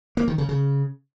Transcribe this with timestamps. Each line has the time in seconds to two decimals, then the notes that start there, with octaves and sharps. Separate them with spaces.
0.17 A#3
0.28 D#3
0.38 C#3
0.49 C#3